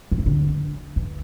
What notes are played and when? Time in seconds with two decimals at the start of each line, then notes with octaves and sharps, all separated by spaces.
0.11 F3
0.18 E3
0.26 D3
0.96 E3